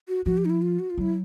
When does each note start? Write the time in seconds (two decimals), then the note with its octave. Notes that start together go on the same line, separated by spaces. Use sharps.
0.08 F#4
0.25 F3 F#4
0.38 G4
0.45 D#4
0.50 E4
0.62 F4
0.79 F#4
0.90 F4
0.98 F#3 E4